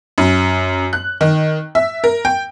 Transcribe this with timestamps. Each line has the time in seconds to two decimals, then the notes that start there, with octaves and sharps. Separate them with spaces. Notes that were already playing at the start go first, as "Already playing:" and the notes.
0.18 F#2
0.93 F#6
1.21 D#3
1.75 E5
2.04 A#4
2.25 G5